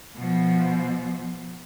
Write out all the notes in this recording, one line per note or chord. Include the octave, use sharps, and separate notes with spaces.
B2 F3